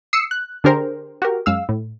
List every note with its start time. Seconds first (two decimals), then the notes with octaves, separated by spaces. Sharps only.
0.13 D#6 E6 C7 C#7
0.31 F#6
0.64 D3 D4 G4 G#4 A#4 C5
1.22 F#4 G4 A#4
1.46 F#2 G#3 F5 E6
1.69 A2